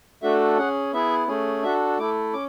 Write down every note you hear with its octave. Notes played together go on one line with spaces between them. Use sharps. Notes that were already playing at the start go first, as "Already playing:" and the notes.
A3 D4 F#4 A4 E5
C#4 G#4 F#5
B3 E4 G#4 E5
A3 C#4 G#4
D4 F#4 A4 E5
A3 E4 A4 D6
C#4 D6